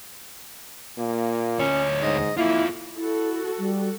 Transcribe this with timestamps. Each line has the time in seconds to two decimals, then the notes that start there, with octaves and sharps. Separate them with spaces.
0.98 A#2 A#3
1.59 D2 C#4 C#5
2.02 G#2 D#5
2.37 A#3 E4 F4 A4
2.97 E4 F#4 A4
3.58 G3